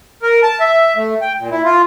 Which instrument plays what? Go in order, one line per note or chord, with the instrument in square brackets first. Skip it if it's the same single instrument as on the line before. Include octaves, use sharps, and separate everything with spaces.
[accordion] A#4
A5
E5
A3
G5
A#2
E4
F4